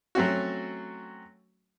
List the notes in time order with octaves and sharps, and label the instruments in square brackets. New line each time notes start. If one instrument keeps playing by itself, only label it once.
[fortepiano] F#3 A3 C4 C#4 F#4